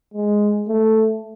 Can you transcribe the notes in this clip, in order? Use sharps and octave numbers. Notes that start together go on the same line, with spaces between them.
G#3
A3